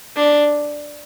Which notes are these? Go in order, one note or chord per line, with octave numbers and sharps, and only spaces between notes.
D4